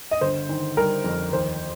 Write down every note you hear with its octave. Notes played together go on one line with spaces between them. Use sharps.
D#5
G1 C5
D#3
G3 A#4
F2
D#2 C5